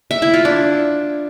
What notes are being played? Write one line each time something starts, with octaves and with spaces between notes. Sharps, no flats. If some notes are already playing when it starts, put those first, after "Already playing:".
E5
E4
F4
D4